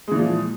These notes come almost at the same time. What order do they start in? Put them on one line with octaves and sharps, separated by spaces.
G#3 E3 A#2 F3